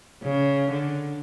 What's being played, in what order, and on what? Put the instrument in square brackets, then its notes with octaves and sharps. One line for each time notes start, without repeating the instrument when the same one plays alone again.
[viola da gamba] C#3
D3